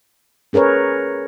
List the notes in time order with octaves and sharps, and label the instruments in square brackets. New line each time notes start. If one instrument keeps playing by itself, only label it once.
[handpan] C#4 G#4 A#4 B4 C#5